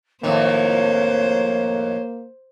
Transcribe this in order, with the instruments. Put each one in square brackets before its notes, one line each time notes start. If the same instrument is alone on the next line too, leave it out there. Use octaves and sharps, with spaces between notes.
[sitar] F2 A2 D#3 [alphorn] A#3 [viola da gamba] C5 [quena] C#5